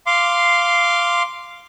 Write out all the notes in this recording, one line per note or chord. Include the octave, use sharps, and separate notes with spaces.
F5 C6 D6